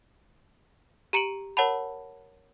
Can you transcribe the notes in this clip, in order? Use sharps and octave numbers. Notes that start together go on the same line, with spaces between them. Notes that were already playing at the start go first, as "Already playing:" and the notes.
G4 A#5 C#7 D7 F#7
A#4 C#5 F#5 A5 B5